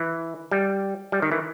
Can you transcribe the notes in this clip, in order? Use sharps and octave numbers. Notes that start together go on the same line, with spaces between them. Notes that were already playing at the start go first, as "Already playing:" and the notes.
Already playing: E3
G3
G3
D#3
E3